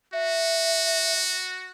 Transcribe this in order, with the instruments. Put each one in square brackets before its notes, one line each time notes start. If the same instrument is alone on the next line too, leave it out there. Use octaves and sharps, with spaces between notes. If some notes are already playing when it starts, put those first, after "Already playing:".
[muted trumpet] F#4 [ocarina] E5